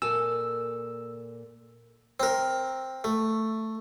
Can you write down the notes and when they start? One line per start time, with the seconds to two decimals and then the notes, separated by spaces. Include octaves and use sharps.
0.02 A#2 A4 G#5 E6
2.20 C4 A#4
3.04 A3